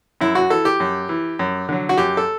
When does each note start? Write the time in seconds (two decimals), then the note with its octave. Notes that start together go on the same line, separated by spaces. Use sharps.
0.21 F#2 E4
0.35 F#4
0.50 E3 A4
0.65 G4
0.80 F#2
1.09 E3
1.39 F#2
1.69 D3 F#3
1.89 F#4
1.98 F#2 G4
2.17 A4